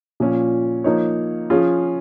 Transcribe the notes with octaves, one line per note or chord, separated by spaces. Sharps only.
A#2 F3 C#4
F3 A#3 D#4 C#5
F3 C#4 F4 G#4